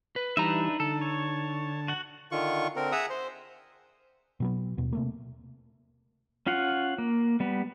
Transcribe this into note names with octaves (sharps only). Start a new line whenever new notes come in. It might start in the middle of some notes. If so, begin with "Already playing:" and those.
B4
E3 G3 D4 D#4 B4 E5 A#5
D3 A4 A5
C#5
F#4 F#5
D3 D#3 F4 C#6
D3 C4 A#4
G#4 E5 F#5 A#5 D#6 E6
C5
B2 F#3 B3
D#2 B2
C3 A3 A#3
C#4 F4 F5 F#5
A#3
G3 B3